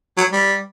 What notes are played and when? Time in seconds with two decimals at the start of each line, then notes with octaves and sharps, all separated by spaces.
0.17 F#3
0.32 G3